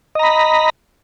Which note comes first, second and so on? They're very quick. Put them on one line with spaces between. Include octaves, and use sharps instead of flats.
D#5 A#5 B5